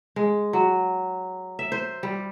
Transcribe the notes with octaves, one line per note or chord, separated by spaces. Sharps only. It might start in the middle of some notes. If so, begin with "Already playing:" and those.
G#3
F#3
E5
C5
G3